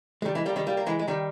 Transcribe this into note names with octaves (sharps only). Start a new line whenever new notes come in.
G#3
D#3 G3
E3 G#3
G3 A#3
D#3 G3
G3 A#3
A#3
E3 G#3
G#3
D#3 G3